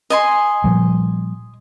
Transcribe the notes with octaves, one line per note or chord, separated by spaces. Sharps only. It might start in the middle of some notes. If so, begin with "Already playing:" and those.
D#5 G#5 C6
A#2 F3 G3